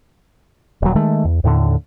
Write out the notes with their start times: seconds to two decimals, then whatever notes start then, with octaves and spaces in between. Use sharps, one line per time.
0.82 D#1 F#3
0.95 D#3 G#3 A3
1.25 E2
1.44 D#2 A2 D3